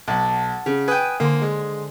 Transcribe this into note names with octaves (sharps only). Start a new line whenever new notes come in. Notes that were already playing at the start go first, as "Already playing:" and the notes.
B1 F#5 A5
C#3
B4 G5 G#5 D#6
D3 A#3 C5
G#3